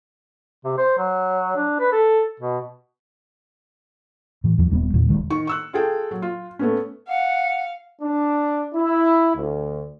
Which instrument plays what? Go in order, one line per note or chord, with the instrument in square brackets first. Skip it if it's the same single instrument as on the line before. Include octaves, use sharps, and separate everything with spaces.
[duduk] C3
C5
F#3
D4
B4
A4
B2
[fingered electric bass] A2 E3
E2 F3
D#1 G3 A#3 B3
E2 A#2 D#3
E1 C2 D#3 G#3
[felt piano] D#3 C#6
C#6 E6 F#6
F4 G#4 A4 G5
F#3
F4
A3 B3 C#4
[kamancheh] F5 [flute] F#5
[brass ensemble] D4
E4
D2